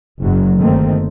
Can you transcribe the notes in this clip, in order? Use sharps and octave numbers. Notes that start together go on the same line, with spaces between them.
F#1 F#2 F#3
G1 D#3 A3 A#3 C4